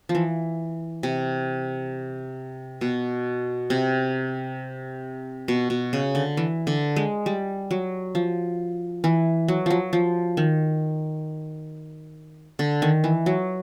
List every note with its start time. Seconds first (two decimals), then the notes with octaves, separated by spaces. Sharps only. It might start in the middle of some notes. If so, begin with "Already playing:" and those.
0.09 F3
0.15 E3
1.03 C3
2.81 B2
3.70 C3
5.48 B2
5.70 B2
5.93 C#3
6.15 D3
6.37 E3
6.67 D3
6.96 G#3
7.26 G3
7.71 F#3
8.15 F3
9.04 E3
9.48 F#3
9.66 F3 F#3
9.93 F3
10.37 D#3
12.59 D3
12.82 D#3
13.04 E3
13.26 F#3